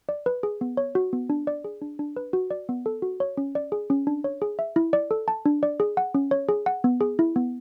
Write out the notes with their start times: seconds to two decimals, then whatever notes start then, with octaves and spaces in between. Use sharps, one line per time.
0.09 D5
0.26 B4
0.43 G#4
0.61 B3
0.77 C#5
0.95 F#4
1.13 B3
1.30 D4
1.47 D5
1.64 G#4
1.82 D4
1.99 D4
2.16 B4
2.33 F#4
2.51 D5
2.69 B3
2.86 A4
3.02 F#4
3.20 C#5
3.37 C#4
3.55 D5
3.72 G#4
3.90 C#4
4.07 D4
4.24 C#5
4.42 G#4
4.59 E5
4.76 E4
4.93 D5
5.11 A4
5.28 A5
5.46 D4
5.63 D5
5.80 G#4
5.97 F#5
6.14 C#4
6.31 C#5
6.49 G#4
6.66 F#5
6.84 B3
7.01 G#4
7.19 E4
7.36 B3